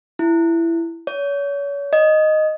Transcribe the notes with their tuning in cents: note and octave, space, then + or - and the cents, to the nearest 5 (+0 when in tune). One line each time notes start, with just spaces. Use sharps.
E4 +15
C#5 +35
D#5 -5